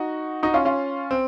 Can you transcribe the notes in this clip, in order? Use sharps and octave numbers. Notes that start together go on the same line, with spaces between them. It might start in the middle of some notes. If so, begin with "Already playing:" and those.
Already playing: D#4 F#4
D#4 F#4
C#4 F4
C#4 F4
C4